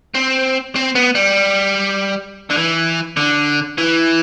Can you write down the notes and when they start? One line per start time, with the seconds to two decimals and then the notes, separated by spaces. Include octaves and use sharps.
0.15 C4
0.75 C4
0.95 B3
1.15 G3
2.50 D3
2.56 E3
3.17 D3
3.78 E3